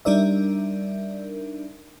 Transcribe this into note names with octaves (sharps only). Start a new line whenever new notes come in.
G3 D4 D#4 A#4 D5 E5